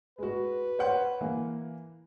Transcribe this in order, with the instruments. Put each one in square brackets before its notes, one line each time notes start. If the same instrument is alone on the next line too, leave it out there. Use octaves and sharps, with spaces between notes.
[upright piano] G#3 F#4 [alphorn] B4
[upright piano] C5 C#5 F#5
E3 A#3